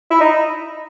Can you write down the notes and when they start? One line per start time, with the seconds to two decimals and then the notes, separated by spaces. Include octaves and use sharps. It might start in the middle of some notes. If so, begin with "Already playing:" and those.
0.11 E4
0.21 D#4